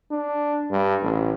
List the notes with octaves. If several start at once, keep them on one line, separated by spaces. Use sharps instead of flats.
D4
G2
A1